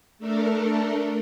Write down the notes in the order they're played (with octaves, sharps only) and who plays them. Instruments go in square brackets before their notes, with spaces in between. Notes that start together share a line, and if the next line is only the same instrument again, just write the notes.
[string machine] A3 D4 A4 A#4